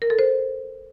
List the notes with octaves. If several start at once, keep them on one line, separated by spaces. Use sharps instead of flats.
A#4
A4
C5